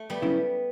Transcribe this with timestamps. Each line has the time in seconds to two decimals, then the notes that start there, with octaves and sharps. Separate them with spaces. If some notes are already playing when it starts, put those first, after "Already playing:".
Already playing: A3
0.10 G3 B3
0.22 C#3 F#3 C#4 E4